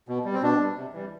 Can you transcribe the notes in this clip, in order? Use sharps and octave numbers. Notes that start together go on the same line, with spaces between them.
B2
G3
C4
B2 D4
G3
C3
E3 G3